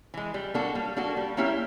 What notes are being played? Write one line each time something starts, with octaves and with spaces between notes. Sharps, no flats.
E3 G#3
G3
A#3 D4 F#4 A4
G3
A#3 D4 F#4 A4
G3
A#3 C#4 E4 G4